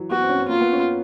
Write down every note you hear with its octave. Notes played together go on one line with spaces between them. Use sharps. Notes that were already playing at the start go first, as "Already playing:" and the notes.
Already playing: E3 F#3
B3 F#4
C4
C#4
C4
A#3 F4
B3
C#4